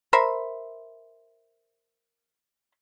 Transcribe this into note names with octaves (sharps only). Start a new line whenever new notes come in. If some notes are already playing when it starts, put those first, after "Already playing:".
A#4 C5 E5 B5